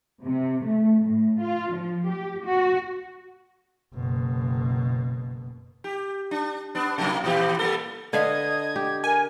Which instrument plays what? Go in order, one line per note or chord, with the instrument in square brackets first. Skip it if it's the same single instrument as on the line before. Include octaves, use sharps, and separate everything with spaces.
[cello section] C3
A3
A2
F4
F3
G4
F#4
[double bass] F#1 B2
[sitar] G4
D4
B3 D4
C3 F#3 A#3
A#2 E3 G4
G3 A#3 A4
[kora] D3 B4 F5 [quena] D#5 [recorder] G#6
[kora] G4
[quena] A#4 [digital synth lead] G#5